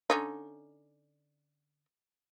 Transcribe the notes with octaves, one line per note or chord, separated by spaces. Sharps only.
D3 C#4 D#4